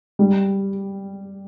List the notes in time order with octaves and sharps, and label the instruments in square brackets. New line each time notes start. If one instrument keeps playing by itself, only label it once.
[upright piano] G3